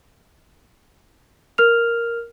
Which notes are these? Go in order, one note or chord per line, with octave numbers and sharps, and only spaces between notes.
A#4 F6 F7